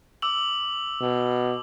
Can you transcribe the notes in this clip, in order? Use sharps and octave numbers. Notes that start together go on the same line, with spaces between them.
D6 E6 F#7
B2